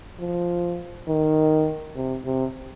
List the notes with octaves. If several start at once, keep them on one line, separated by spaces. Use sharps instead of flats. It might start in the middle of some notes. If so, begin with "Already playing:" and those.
F3
D#3
C3
C3